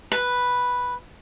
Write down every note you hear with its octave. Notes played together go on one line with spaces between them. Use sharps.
B4